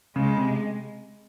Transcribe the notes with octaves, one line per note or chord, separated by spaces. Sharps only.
C#3 G#3
C3